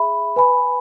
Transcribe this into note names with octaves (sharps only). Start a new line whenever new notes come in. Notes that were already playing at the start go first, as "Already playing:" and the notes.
Already playing: G#4 E5 B5
B4 G#5 B5